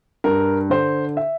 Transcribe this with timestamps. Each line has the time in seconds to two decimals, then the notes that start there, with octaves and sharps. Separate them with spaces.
0.24 G2 A#4
0.70 D3 C5
1.17 E5